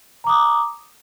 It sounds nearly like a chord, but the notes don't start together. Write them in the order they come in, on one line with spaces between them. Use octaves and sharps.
A#5 D6 D#6